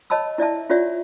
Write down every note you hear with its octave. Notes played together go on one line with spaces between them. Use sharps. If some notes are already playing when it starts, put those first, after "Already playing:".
C#5 D#5 A5 B5 E6
E4 D5 E5 A5
F4 G4 C#5 D5 E5 F#5